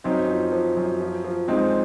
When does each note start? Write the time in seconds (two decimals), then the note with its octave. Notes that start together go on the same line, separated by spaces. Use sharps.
0.04 F#2 C4 D#4
0.28 F3
0.52 F3
0.77 F#2
1.00 F3
1.24 F3
1.48 G#3 C4 D#4